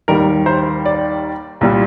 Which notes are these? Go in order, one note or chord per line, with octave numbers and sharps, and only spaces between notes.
D#2 D#3 G3 A#4
C5
D5
C2 A#2 G3